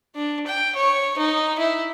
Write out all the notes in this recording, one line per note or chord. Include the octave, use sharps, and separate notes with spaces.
D4
G5
C#5
D#4
E4